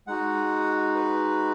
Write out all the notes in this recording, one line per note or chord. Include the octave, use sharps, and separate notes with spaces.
G#3 D#4 F#4 F#5
B4